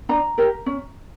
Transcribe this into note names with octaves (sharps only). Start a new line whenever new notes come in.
D4 A#5
G4 A#4
C#4